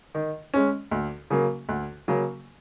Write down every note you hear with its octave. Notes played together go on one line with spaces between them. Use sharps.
D#3
G#3 C#4
D2
C#3 F#3 A#3
D2
C#3 F#3 A#3